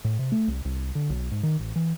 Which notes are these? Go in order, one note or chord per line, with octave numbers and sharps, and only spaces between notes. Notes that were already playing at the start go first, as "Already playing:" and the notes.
A2
C3
A3
C2
C2
D3
B1
G#2
D#3
A1
E3